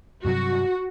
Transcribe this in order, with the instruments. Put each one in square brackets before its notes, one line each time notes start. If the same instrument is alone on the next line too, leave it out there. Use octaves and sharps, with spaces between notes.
[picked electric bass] G2 C3 F#3 [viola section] F#4